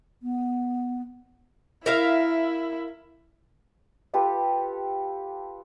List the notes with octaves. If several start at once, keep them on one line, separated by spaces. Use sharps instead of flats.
B3
E4 A#4 E5 F5
F4 G4 A4 B4